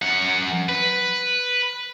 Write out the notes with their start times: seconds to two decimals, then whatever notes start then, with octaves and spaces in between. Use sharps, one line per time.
0.02 F#2 F#5
0.69 B4